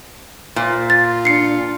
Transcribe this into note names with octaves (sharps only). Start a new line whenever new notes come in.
A#2 C5
F4 A6
D4 C7 C#7